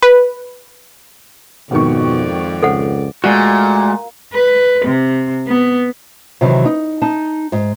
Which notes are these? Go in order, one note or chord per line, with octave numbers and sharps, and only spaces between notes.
B4
G#1 F2 B2 D#3 D5 C#6
C#2 A4 C5 F#5
A#2 G#3 A3 F#4
B4
C3
B3
C3 D#3 E3 F#3
D#4
D#4 A5
G#2